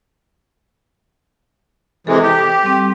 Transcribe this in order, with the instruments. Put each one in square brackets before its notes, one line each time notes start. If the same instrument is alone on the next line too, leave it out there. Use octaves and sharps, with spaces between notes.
[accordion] C3 E3 G#3 [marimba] A4
[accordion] G4
[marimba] G3 C4